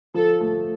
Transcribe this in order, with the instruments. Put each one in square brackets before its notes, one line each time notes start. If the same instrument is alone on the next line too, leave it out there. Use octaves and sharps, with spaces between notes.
[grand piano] F3 [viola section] A4
[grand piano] A3